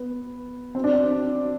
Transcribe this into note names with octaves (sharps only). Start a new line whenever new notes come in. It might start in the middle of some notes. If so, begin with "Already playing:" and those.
Already playing: B3
C4
D4
C4